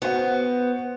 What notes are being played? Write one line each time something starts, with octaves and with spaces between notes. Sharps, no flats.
B3 F#4 C5 F#5